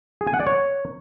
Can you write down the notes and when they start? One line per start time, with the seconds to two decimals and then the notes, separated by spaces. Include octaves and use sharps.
0.21 G#4
0.27 G#5
0.34 F#5
0.40 D5
0.47 C#5